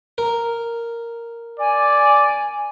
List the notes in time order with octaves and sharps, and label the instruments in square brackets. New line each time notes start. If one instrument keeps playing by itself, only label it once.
[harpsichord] A#4
[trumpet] D5 [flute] G#5